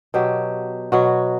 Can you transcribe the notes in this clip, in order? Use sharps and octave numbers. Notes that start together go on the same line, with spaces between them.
B2 F#3 G4
B2 F#3 F#4